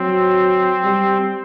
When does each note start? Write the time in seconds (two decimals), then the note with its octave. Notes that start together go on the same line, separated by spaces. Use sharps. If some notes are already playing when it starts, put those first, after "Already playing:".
Already playing: F#3 C4
0.84 G3